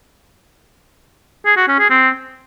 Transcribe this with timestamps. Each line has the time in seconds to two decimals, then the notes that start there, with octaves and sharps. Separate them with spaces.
1.46 G#4
1.57 F#4
1.68 C#4
1.79 G#4
1.90 C4